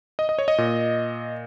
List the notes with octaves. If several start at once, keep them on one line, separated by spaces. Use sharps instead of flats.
D#5
D#5
C#5
D#5
A#2